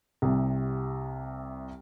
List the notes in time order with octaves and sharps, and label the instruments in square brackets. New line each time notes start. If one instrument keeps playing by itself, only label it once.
[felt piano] C2 C3